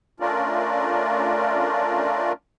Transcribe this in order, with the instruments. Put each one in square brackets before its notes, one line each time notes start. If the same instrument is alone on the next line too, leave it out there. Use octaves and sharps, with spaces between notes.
[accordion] A3 C#4 D4 F4 A#4 D5